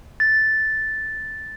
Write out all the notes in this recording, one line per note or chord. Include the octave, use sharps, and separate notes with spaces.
A6